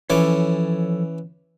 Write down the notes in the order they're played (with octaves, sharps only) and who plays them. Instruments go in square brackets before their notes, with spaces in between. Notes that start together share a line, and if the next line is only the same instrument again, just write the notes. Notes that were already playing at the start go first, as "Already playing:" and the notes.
[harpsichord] E3 C#4 D6 [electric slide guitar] F3 A4 C#5